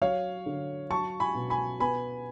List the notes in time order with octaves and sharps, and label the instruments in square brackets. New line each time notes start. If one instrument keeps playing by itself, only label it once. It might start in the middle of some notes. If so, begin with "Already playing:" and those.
[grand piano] F#3 C#5 F5
D3
F#3 A5 C#6
G#5 B5
B2
G#5 B5
B3 G#5 B5